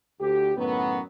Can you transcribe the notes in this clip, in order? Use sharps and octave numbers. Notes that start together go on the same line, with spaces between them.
D2 G4
F#2 A2 D#3 F#3 B3